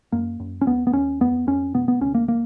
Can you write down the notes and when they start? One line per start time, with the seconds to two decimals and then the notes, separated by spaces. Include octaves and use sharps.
0.12 F#2 A#3
0.40 F#2
0.61 C#4
0.66 D#2 B3
0.87 B3
0.93 D#2 C#4
1.20 F2 B3
1.47 F2 C#4
1.74 B2 B3
1.88 B3
2.01 C#2 C#4
2.15 A#3
2.28 A#3